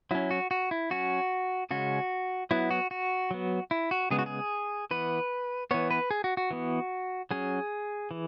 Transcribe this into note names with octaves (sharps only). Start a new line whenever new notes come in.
F#3 C#4 E4
F#4
F#4
E4
F#3 C#4 F#4
C#3 G#3 C#4 F#4
F#3 B3 E4
F#4
F#4
F#3 B3
E4
F#4
C#3 G#3 B3 G#4
F#4
G#4
E3 B3 B4
E3 B3 C#5
B4
G#4
F#4
F#4
E3 B3
F#3 C#4 G#4
E3